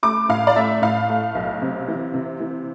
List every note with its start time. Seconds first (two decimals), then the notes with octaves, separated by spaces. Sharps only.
0.03 A3 D6
0.29 A2 F5
0.47 D5
0.56 A3 E5
0.82 A2 F5
1.09 A3
1.35 B1
1.62 C3
1.88 E3
2.14 C3
2.40 E3